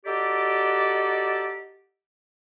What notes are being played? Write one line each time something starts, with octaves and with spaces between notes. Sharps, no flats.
D#4 F#4 G4 A4 D5